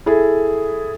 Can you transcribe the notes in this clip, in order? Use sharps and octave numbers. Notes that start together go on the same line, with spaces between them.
E4 G#4 A4